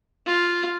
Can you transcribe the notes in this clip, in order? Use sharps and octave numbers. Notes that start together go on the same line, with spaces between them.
F4